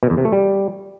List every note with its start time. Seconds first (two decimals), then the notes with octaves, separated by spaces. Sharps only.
0.03 B2
0.10 E2
0.17 C3
0.25 A3
0.32 G3